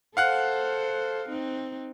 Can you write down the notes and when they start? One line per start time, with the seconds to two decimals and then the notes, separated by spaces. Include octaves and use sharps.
0.17 A4 C5 F5 F#5 F#6
1.28 C4 D#4